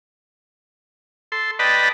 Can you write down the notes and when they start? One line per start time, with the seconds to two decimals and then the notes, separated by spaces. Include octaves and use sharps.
1.32 A4 C6
1.59 B4 D5 D#5 G5 A5 B5